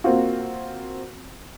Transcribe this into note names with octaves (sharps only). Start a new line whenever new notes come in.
A#3 C4 F4 F#4